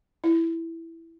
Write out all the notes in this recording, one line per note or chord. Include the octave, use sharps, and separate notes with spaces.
E4